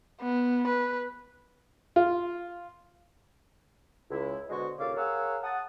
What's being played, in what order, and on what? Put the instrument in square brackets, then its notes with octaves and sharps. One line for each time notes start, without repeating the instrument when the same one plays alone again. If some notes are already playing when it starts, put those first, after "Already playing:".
[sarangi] B3
B4
[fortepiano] F4
[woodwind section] C#2 E4
B2 D3 G#3 F#4 C5 C#6
D#2 A#2 C#3 A4 F5 D6
G#4 A#4 C#5 F5 F#5 E6
F#5 A5 D#6